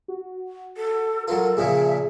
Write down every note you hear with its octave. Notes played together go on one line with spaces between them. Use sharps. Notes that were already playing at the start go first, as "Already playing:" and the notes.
F#4
A4
F#3 F4 A4 A#4
A#2 C#3 F3 G#4 E5